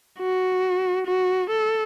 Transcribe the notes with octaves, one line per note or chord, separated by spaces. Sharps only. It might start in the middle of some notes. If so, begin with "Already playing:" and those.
F#4
F#4
A4